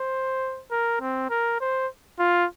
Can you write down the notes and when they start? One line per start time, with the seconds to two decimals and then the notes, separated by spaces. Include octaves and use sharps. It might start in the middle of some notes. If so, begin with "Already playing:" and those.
Already playing: C5
0.71 A#4
1.01 C4
1.30 A#4
1.60 C5
2.19 F4